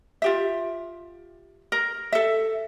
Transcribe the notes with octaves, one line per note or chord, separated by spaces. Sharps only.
F4 G4 E5
A#4
A4 E5